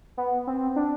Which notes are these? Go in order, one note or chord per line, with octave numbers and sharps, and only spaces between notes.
B3
C4
D4